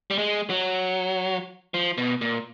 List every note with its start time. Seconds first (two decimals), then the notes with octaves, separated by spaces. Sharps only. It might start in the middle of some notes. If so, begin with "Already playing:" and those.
0.11 G3
0.18 G#3
0.50 F#3
1.74 F3
1.98 B2
2.21 A#2